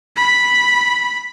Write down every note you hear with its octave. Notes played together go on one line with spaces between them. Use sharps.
B5